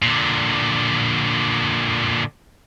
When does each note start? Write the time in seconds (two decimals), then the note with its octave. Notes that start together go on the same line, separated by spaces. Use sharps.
0.02 A#2 D3